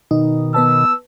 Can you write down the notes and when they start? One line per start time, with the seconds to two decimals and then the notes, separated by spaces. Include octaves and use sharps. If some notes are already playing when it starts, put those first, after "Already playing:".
0.11 B2 D#3 D#4
0.54 B3 B4 A5 E6